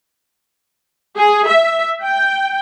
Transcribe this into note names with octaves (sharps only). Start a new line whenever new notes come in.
G#4
E5
G5